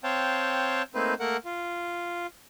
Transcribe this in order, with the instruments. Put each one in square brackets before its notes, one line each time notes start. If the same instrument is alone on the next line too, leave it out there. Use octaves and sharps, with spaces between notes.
[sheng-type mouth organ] C4 C#5 F5 G5 A5
A3 A#3 C4 D#4 B4
A3 A#3 A#4 F#5
F4